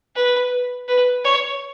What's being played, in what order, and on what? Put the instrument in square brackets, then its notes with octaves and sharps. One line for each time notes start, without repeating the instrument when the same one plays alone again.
[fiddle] B4
B4
C#5